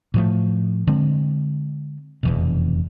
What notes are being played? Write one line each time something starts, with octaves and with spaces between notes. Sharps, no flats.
A2 F3 A3
D3 G#3 C4
F1 E2 B2